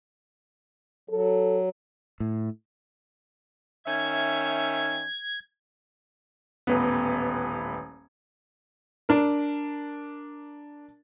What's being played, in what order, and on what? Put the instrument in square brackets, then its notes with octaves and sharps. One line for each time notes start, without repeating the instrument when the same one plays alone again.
[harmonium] F#3 [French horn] A4
[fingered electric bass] A2
[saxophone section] D#3 C#4 E5 [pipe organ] G#6
[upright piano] D#1 A1 B3
D4 A#4